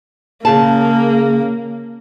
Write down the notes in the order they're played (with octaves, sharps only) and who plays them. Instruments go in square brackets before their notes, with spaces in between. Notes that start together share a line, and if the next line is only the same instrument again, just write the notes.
[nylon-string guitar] C#3 G#4 A5 [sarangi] A#3